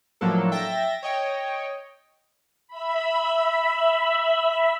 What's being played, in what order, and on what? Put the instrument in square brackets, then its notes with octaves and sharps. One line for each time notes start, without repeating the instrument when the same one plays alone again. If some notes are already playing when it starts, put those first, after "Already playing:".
[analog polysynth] A2 F3 F#3 A#3 D4 A4
E5 G5 A6 A#6
C#5 D#5 G5
[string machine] E5 B5